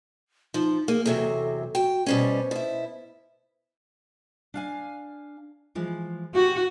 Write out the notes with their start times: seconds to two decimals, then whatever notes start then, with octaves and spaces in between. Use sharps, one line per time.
0.54 F3 D#4
0.88 A#3 G#4
1.06 E2 C3 F#3 A4
1.75 F#4 G5
2.06 B2 G3 C#4 C5
2.51 B2 E4
4.54 D4 F5 G#5
5.75 E3 F3 G#3
6.35 F#4 G4